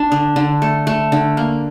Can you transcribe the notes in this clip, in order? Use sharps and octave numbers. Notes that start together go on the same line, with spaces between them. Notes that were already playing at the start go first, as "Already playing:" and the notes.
Already playing: D4
D3
D3
A3
A3
D3
A#3